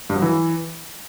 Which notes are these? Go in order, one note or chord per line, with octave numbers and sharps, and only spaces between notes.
G2
F#3
E3